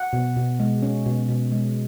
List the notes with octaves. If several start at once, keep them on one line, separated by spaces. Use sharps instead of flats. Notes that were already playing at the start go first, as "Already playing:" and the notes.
Already playing: F#5
B2
B2
G#3
C#4
B2
B2
G#3